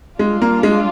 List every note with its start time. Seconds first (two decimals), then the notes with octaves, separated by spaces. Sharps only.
0.19 G3 G#3 D4 F4
0.42 A#3
0.63 G#3